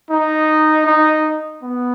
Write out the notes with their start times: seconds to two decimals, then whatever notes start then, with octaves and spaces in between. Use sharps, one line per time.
0.10 D#4
0.87 D#4
1.63 B3